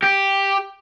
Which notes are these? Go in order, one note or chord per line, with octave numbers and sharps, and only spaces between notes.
G4